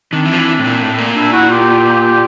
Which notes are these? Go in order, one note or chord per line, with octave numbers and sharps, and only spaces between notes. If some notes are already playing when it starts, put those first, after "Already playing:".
D#3 C4 D4
E3
F3
E3
A2
A#2
A2
A#2
D4 E4
E4 F#4
F4 G4